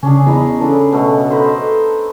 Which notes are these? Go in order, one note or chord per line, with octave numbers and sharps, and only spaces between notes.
C#3 C#4 D4 G#4
E2 D#4 G#4 B4
C#3 D4 A4
B2 A3
D#4 B4 C5